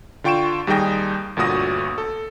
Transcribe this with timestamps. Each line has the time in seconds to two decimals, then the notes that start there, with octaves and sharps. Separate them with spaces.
0.24 D3 F4 G5 C#6 D7 E7
0.67 D#2 G3 D#4 G#4 G5 A#6
1.36 G1 D2 A#2 F#4 D#6 A#6
1.98 A4